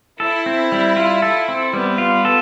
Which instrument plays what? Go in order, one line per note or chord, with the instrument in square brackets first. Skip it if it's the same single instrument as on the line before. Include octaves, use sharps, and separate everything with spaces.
[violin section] E4 [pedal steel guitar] A4
[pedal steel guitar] C4
G3
F4
A4
C4
[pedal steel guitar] G3 [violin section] B3
[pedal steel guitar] F4
A4